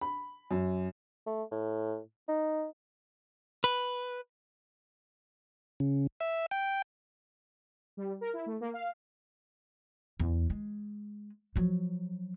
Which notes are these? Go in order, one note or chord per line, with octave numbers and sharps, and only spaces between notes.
B5
F#2
A3
A2
D#4
B4
C#3
E5
G5
G3
A#4
E4
A3
A#3
F5
E2
G#3
F3 F#3